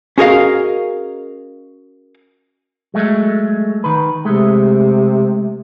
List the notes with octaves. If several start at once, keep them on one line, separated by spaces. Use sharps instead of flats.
C#4 F#4 G#4 A#4 D#5 F5
F#3 G#3 A3
D#3 B4
C3 G#3 A3